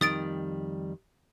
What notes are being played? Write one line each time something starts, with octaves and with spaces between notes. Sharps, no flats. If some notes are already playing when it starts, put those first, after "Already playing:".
F2 D#3 G3 D#6 A6 D7